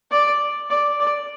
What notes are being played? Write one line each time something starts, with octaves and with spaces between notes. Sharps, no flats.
D5
D5
D5